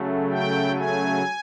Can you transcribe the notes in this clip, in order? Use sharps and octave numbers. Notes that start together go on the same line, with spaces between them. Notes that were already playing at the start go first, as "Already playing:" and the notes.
Already playing: C#3 F#3 A3
G5
G#5